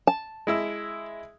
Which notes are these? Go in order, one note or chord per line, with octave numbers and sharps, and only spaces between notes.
A5
G#3 E4 E6